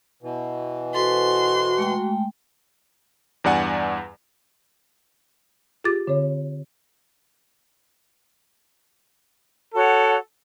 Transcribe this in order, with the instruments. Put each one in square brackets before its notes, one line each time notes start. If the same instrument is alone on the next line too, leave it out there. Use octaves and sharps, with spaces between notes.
[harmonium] B2 E3
[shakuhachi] F#4 [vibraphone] A4 B4 C5 [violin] C6
[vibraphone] G#3 A3 G5
[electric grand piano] E2 G2 D5 F#5 G#5
[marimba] F4 G4 G#4 D6 A6
D3 C4 C#5
[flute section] F#4 C#5 F#5 [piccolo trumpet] A4